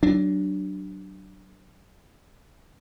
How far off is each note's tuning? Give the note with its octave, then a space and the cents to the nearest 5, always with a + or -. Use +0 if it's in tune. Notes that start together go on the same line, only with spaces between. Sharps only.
F#3 +30 D4 +5